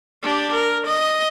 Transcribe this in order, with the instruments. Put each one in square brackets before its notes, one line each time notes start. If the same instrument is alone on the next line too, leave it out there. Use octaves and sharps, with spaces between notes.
[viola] D4 G4
A#4
D#5